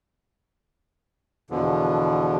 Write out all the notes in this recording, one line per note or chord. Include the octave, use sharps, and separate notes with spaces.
E2 B2 D3 F3